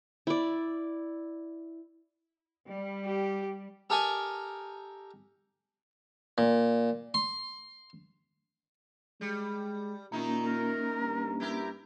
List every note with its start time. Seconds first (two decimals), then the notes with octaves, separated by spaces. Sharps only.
0.27 E4 D5
2.70 G3
3.05 G4
3.90 G4 A4 A#4 D#5 G5 G#5
6.38 A#2
7.14 C6
9.21 G3 G#3
10.12 A#2 D#3 A#3 C#4 D#4 E4
10.44 A#4
11.01 G2
11.40 E4 G4 A#4